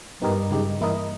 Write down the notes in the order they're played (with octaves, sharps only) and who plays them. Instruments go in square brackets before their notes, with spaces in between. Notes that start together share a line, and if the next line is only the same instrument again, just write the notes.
[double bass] G2 [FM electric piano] B3 D#4 G4 A#4 D#5
[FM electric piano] C#3 G#3 D#4 G4
E3 A#3 E4 A#4 D#5